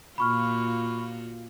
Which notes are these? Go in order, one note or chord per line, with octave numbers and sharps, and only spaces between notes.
A#2 F4 F#4 B5 C#6 F6